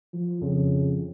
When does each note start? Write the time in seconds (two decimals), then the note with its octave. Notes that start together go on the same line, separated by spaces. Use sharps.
0.13 F3
0.41 F2 C#3